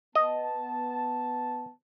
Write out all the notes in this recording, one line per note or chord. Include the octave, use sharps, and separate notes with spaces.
B3 D#5 A5